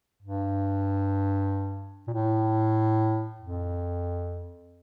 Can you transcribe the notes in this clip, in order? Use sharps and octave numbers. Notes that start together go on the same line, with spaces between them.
G2
A#2
A2
F2